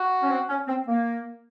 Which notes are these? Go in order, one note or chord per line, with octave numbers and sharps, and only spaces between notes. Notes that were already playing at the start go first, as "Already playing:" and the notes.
Already playing: F#4
C#4
C4
C#4
C4
A#3